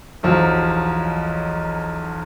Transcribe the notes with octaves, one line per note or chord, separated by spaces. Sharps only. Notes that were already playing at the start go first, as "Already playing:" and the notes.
B1 E2 F3 F#3